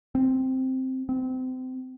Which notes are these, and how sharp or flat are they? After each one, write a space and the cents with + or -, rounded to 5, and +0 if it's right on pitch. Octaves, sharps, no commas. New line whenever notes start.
C4 +0
C4 -30